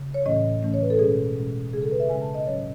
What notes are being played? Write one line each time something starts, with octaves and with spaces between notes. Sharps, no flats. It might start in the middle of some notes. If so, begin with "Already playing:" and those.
Already playing: C#3
C#5
A2 E3 A3 C#4 D#5
A2 E3 A3 C#4
C#5
B4
A4
B2 G#3 C#4 G#4
B2 G#3 C#4
C#3 G#3 C#4 G#4
A4
B4
E5
C#3 G#3 C#4 G#5
A5
D#5
A2 F#3 C#4 C#5